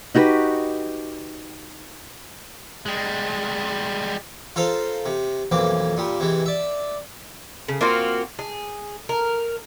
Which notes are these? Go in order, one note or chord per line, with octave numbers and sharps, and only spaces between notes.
D#4 F#4 G4 B4
G3 G#3
F4 A4 A#4 C5 F5
C3
B1 F2 E3 A#3 D6
A#2 G3
C3 E3 G#3
D5 E5
C#3
A#3 C4 F4 F#4
G#4
A#4